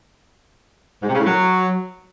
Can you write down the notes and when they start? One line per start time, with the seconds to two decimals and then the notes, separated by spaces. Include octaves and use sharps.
1.02 G#2
1.08 C3
1.14 C#3
1.20 A2
1.26 F#3